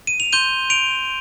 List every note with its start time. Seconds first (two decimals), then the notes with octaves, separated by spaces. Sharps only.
0.07 D#7
0.20 F7
0.33 C6 G6 D#7 G7
0.70 D7 F7